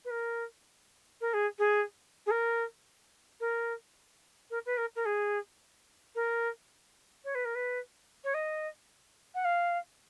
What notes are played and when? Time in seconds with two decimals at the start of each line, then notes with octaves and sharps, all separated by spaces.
0.05 B4
0.11 A#4
1.21 A#4
1.33 G#4
1.58 G#4
2.26 G#4
2.31 A#4
3.40 A#4
4.50 A#4
4.66 B4
4.77 A#4
4.96 A#4
5.05 G#4
6.15 A#4
7.24 C#5
7.35 B4
7.45 A#4
7.55 B4
8.24 C#5
8.34 D#5
9.35 F#5
9.45 F5